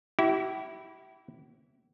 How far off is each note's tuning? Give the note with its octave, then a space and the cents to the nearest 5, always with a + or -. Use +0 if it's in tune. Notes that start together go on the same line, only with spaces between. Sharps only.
E4 -5 G4 -45